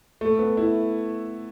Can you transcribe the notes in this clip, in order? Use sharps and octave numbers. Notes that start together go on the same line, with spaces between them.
A3
B3
E4